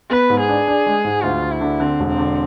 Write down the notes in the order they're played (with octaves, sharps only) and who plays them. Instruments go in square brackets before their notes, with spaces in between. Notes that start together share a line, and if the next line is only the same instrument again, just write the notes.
[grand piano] B3 [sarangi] B4
[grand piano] G#2
[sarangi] G#4
[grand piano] D4
D4
G#3
G#2
[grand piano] D2 [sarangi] F4
[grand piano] D2
[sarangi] E4
[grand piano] D3
[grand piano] D3 [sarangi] C4
[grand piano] E1
[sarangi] C4
[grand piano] D3